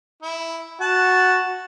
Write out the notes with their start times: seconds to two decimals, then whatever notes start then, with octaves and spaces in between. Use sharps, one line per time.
0.22 E4
0.81 F#4 F#5 A5